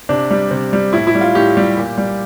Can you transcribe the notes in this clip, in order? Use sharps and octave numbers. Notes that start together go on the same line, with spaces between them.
C3 D4
G3
C3
G3
A2 E4
E4
G3
F4
A2 G4
G3
A#2
G3